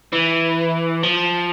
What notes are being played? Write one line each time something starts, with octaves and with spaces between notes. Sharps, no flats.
E3
F3